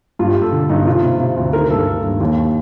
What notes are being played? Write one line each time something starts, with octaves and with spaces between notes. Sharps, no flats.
G2 F4
G4
G2
A4
D3
G2 D#4
C3 F4
C3
C3
D2
D#3 A#4
G2 A4
D#3
G2
D#2